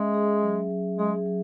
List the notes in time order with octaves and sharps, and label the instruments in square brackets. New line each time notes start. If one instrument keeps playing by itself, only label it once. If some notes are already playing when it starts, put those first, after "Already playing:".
Already playing: [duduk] G#3 [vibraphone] C#4 G#4 E5
[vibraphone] G#4
F#3
F#3
[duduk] G#3 [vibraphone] G#4
[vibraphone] F#3